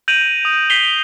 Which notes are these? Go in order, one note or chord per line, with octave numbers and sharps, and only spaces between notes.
G6 A#6 D7 D#7 F7 F#7
D#6
B6 C7 D7 F7 G7